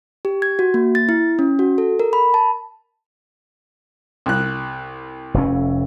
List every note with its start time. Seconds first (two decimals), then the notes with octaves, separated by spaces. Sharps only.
0.25 G4
0.42 G#6
0.59 F#4
0.74 A#3
0.95 A6
1.09 E4
1.39 C#4
1.59 F#4
1.78 A4
2.00 A#4
2.13 B5
2.34 A5
4.26 C2 F#6
5.34 F1 F2 C#4